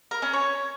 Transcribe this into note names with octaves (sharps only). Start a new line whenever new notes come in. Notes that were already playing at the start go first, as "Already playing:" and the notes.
A#4
C#4
C#5